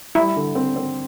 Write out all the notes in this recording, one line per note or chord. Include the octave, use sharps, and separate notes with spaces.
G3 E4
D3
C4
C4